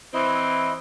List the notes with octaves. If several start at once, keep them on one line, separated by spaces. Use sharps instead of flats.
E3 C4 E4 D#5